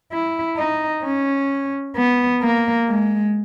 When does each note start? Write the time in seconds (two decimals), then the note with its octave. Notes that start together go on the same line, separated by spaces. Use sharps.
0.13 E4
0.58 D#4
1.05 C#4
1.96 B3
2.42 A#3
2.89 G#3